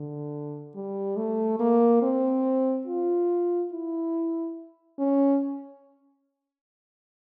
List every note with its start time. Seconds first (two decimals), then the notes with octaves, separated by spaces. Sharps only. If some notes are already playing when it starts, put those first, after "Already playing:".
Already playing: D3
0.75 G3
1.16 A3
1.60 A#3
2.02 C4
2.87 F4
3.72 E4
4.99 C#4